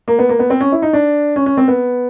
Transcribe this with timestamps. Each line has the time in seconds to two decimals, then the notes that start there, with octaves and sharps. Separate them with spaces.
0.08 A#3
0.19 B3
0.29 A#3
0.39 B3
0.50 C4
0.61 C#4
0.72 E4
0.82 D#4
0.93 D4
1.36 C#4
1.46 C#4
1.57 C4
1.68 B3